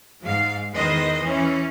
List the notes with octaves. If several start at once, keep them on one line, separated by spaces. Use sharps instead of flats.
G#2 F5
E2 D#3 B4 C5 D#5
E3 C#4